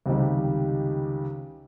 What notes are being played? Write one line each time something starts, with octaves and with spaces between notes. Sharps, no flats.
C#2 C3 D#3 G3